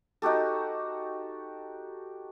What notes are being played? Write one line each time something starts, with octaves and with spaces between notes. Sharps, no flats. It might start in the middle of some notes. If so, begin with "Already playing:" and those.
D#4 F#4 G4 A4